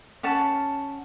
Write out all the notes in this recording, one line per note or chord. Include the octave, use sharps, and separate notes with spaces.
C#4 F#5 A5